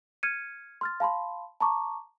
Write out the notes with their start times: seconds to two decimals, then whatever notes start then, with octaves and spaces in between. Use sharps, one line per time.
0.23 F6 G#6 C#7 D#7
0.81 C6 F6 A6
1.00 F5 A5 B5 C6
1.60 A5 A#5 C#6 D6